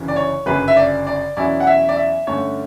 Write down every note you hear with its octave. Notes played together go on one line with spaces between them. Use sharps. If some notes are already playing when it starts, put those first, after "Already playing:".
Already playing: G1 F#2 C#3 E3
D5
C#5
G1 F#2 C#3 B4
E5
D5
D5
E2 B2 F#3 C#4 E4 D5
F#5
E5
D5
E5
G2 D3 A3 C#4 C#5